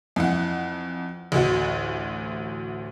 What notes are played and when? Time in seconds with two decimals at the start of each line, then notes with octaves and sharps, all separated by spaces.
0.16 F2 E3 F#5
1.32 A1 D2 F#4